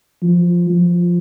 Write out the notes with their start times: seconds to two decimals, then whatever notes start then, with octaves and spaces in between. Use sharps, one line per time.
0.22 F3
0.70 F3